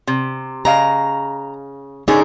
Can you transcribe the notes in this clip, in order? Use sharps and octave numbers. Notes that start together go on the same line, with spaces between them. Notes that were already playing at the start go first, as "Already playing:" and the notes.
C3
C#3 D#5 F5 A#5
D3 C#4 D#4 G#4 A#4